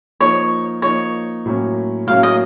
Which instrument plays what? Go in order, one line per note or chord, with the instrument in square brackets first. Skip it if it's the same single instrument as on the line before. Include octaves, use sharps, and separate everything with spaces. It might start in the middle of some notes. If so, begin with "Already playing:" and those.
[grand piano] F3 A#3 D#4 [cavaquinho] C#5
[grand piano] F3 A#3 D#4 [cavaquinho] C#5
[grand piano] A2 F#3 A#3 C#4
[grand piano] A2 F#3 A#3 C#4 [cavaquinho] F5
[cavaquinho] D#5